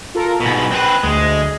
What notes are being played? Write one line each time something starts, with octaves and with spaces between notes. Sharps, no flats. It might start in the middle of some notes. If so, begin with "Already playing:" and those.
F4 A4 A#4
G#2 B2 B5
C4 B4 F#6
D2 G#3